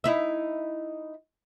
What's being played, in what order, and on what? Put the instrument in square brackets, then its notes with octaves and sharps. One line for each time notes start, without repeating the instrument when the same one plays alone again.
[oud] D#4 E4 E5